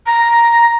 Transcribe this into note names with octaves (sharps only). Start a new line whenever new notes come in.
A#5